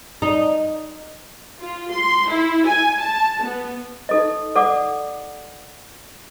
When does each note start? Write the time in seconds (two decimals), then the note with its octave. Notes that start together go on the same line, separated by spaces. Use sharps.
0.22 D#4
1.61 F4
1.94 C6
2.31 E4
2.68 G#5
3.01 A5
3.43 B3
4.09 D#4 A4 D#5
4.55 A4 D5 F#5 D6